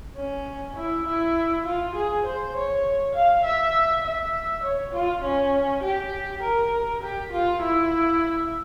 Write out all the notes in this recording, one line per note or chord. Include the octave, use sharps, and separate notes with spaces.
C#4
E4
E4
F4
G#4
C5
C#5
F5
E5
E5
C#5
F4
C#4
G4
A#4
G4
F4
E4